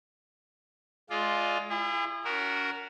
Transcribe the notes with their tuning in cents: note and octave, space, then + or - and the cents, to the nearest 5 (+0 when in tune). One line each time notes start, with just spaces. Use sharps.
G#3 +20 F4 +0 D5 +0
E4 +35 G#4 -35
C#4 +40 F#4 +0 A#4 +0